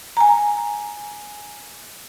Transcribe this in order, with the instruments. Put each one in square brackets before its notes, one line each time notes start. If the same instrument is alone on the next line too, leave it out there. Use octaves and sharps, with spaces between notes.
[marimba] G#5 A#5